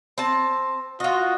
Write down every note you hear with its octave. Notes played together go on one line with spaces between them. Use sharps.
C4 A5
F4 F#4 D#5